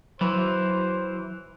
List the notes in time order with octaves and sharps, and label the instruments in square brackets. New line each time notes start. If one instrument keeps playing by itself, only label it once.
[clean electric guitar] E3 [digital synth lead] F#3 [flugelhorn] C5